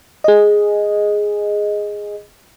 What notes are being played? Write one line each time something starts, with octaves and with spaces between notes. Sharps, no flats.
G#4 D#5